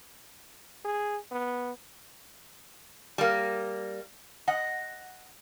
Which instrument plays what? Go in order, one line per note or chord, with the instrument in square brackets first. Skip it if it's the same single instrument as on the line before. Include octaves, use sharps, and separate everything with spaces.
[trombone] G#4
B3
[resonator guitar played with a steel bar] G3 A#3
D#5 F#5